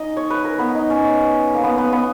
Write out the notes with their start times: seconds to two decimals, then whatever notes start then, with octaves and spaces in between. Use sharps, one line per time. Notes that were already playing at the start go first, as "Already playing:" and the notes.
Already playing: C#4 D#4 D#5
0.17 C#5
0.30 B4
0.45 A#4
0.58 B3 B4
0.75 D#4
0.90 C#4
1.54 A#3
1.63 B3
1.78 B3
1.92 B3